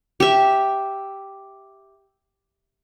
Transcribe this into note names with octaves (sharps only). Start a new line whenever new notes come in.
G4 E5